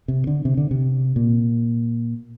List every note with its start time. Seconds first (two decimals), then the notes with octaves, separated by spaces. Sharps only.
0.08 C3
0.27 D3
0.45 C3
0.57 D3
0.71 C3
1.16 A#2